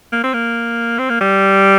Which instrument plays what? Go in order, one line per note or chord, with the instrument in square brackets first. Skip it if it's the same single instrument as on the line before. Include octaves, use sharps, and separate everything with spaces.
[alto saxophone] A#3
C4
A#3
C4
A#3
G3